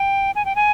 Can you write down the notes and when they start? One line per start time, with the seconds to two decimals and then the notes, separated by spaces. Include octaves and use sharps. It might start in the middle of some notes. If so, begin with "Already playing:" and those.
Already playing: G5
0.35 G#5
0.45 G5
0.56 G#5